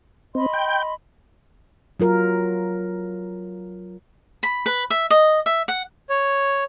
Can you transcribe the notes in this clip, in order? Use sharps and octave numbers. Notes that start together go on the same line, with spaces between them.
C4 D#5 B5 C6
G5
F#3 F4 A#4
B5
B4
E5
D#5
E5
F#5
C#5